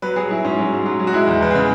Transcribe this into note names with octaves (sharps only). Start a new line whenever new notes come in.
F#3 B4
F#3 G#4
F#3 E4
G#2 C#4
F#3
G#2
F#3
F#3
F#4
G#3 E4
E2
E2 B4
G#4
C#3